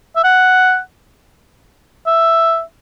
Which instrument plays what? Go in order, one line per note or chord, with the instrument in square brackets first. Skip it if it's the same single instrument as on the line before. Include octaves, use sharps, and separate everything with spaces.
[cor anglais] E5
F#5
E5